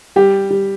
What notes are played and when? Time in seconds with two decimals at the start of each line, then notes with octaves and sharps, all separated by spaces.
0.16 G3 G4
0.50 G3